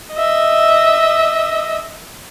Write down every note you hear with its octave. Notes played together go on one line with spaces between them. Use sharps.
D#5 E5